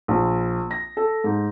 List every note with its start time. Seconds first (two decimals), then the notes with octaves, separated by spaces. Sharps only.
0.08 A#1
0.71 A#6
0.97 A4
1.24 G#2